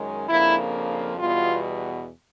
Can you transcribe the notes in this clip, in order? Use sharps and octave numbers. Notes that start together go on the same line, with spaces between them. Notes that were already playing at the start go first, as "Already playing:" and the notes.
Already playing: F#2 D#3 G#3 C#4
F2 C#3 F3 A#3 D4 E4
E2 B2 G3 F4